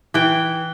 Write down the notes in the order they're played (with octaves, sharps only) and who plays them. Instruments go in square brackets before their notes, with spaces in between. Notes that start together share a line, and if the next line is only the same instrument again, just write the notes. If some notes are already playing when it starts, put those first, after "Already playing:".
[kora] E3 G5